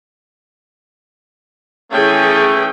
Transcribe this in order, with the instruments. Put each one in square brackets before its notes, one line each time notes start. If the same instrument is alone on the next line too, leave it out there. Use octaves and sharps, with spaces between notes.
[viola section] E3 G#4 G5 [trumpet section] A3 C#4